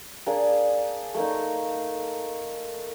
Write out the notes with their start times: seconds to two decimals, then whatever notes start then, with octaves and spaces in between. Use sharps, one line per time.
0.26 A#3 D4 G#4
1.15 A3 A#3 D#4